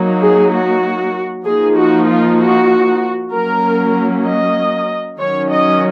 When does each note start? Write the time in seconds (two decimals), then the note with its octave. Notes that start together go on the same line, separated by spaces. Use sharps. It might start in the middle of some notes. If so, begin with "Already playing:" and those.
Already playing: F#3 A#3 D#4
0.21 G#4
0.52 F#4
1.45 F3 A#3 D#4 G#4
1.77 F#4
2.09 F4
2.39 F#4
3.33 F#3 A#3 C#4 A#4
4.26 D#5
5.19 D#3 F#3 C#4 C#5
5.51 D#5